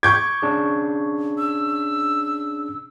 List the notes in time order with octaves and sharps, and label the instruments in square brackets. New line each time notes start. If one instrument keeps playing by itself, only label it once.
[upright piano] C#6 G6 G#6 [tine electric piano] D6
[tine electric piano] C#4 D4 G#4
[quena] E6